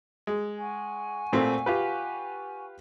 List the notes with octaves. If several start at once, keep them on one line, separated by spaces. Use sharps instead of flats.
G#3
F#5 G#5 C#6
A#2 A3 C4
F4 G4 B4